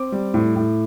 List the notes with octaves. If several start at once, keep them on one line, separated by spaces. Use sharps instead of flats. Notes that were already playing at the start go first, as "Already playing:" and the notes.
Already playing: C4 D6
G3
A2
A2